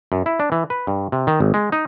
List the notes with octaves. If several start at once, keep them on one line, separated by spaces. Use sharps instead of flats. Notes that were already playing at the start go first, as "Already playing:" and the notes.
F#2
E4
D4
E3
B4
G2
C3
D#3
G#1
G#3
D#4